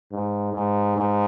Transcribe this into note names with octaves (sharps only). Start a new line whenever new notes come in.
G#2
G#2
G#2